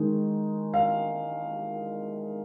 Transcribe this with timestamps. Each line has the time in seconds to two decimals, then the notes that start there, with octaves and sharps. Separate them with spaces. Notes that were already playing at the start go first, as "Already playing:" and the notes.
Already playing: D#3 G#3 D#4
0.74 F5